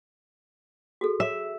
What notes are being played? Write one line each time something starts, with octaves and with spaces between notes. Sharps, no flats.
F#4 G#4 A4
E5